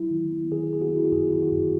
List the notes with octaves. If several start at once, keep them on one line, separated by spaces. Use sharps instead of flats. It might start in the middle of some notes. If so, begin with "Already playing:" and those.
Already playing: F#3 E4
D#3
B3
D#3 G#4
B3 G#4
F#4
B3 E4
F#4
F#2 G#4
D#3 E4
F#4
F#2